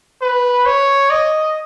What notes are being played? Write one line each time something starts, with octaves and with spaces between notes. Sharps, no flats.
B4
C#5
D#5